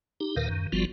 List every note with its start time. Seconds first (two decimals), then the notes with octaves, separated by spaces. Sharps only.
0.20 D#4 G4
0.36 D#2 A#2 D#3 A#4 B4 F5
0.49 F#2 D#3
0.72 G1 F3 G3 B3 F4 F#4